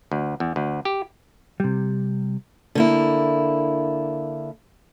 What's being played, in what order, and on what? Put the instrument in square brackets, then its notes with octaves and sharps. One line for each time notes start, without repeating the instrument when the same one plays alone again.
[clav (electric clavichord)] D2
E2
D2
G4
[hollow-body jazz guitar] C3 G3
[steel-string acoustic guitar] D3 A#3 E4